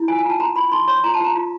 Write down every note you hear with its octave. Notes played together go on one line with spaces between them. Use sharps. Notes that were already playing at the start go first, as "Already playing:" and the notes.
Already playing: E4
F4 G#5
G#5
F4
A5
F#4 A#5
F#4 B5
D#4 C6
C#5 C6
F4 A#5
A5
F4
A#5
F4